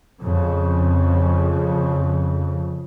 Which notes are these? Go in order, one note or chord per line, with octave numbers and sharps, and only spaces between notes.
F2 C#3